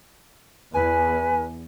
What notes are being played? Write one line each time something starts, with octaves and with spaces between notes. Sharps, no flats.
E2 B4 G#5